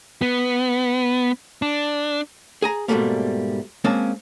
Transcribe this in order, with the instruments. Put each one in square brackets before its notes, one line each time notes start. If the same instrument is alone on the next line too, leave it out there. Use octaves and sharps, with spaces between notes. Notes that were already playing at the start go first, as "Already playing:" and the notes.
[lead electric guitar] B3
D4
[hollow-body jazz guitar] G#4 G#5 A#5
G#2 B2 F#3 G3 A3 A#3
G#3 A#3 C4 C#4 A5